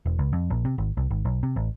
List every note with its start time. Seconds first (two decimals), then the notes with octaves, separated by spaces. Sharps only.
0.06 E1
0.19 C#2
0.33 F2
0.50 A#1
0.65 C3
0.78 G#1
0.97 C2
1.11 G#1
1.25 B1
1.43 C3
1.56 A1